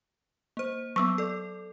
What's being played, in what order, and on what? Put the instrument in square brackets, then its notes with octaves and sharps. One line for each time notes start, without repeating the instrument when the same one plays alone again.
[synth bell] A#3 C5
[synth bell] F#3 B3 [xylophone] C#6 E6
[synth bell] A4 D5